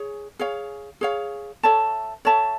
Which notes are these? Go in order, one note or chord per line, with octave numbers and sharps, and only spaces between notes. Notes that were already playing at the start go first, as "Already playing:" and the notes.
Already playing: G#4 C#5
G#4 C#5 F5
G#4 C#5 F5
A4 C#5 E5 A5
A4 C#5 E5 A5